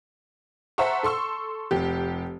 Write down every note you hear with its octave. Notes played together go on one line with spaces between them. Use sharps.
C5 E5 F#5 A5 A#5 C#6
A4 C6 C#6 E6
F1 G4